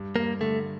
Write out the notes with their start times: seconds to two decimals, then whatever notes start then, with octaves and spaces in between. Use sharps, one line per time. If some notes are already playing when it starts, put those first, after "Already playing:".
Already playing: G2
0.16 G2 A#3
0.40 D3 A3